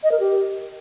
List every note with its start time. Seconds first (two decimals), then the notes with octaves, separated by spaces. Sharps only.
0.03 D#5
0.11 A#4
0.20 G4